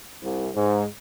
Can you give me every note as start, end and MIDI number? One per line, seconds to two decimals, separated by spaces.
0.22 0.48 36
0.54 0.84 44